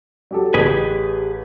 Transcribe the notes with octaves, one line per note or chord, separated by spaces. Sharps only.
F#3 G4 A4
A1 G4 G#4 B4